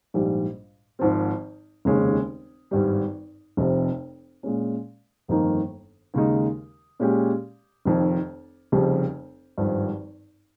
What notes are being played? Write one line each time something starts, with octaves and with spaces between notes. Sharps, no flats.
A#1 G#2 G3
G#1 G#2 F3 C4
F1 D#2 C#3 G#3 C#4
G#1 G2 G3
F1 F2 C3 F3
A#2 G#3 C#4
G1 F2 D#3 A#3 D#4
D#2 C#3 G#3 D#4
A#2 G#3 C#4 G4
F1 F2 D#3
F1 F2 C#3 G3
G#1 G2 F3